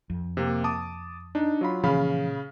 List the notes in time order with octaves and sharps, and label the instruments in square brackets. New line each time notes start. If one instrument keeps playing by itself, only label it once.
[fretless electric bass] F2
[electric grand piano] C3 A#3
A5 D6 D#6
D4 D#4
F#3 F4 B5
[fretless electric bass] A#2 E3 F3 [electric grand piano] C#3 F5 B5